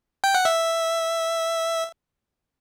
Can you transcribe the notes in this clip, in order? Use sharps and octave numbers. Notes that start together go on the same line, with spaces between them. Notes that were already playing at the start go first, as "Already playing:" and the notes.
G5
F#5
E5